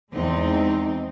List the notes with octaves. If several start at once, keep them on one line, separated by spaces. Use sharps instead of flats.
E2 G#3 C4 D#4